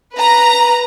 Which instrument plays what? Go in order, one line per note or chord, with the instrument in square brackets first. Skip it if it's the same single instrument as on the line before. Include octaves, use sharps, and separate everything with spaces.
[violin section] B4 A#5